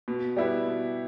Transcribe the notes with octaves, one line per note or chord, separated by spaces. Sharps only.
B2
G3 B3 E4
B2